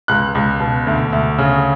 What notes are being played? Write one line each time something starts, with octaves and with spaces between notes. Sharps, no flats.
C#2 F#6
C#2
B2
D2
D2
C#3